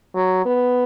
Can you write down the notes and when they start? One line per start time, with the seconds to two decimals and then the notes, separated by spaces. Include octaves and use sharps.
0.15 F#3
0.45 B3